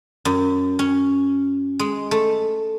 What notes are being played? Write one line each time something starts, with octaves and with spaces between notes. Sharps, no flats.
F#2
C#4
G#3
A3